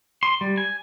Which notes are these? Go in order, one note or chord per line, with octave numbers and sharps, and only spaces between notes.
C6
G3
G#5